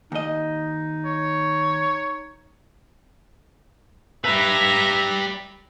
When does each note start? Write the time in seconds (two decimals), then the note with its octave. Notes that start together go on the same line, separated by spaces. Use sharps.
0.12 D#2 D#4 D#5
1.05 C#5
4.24 G3 B4 E5 A#5